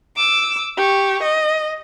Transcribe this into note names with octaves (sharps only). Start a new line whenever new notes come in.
D6 E6
G4 C#6
D#5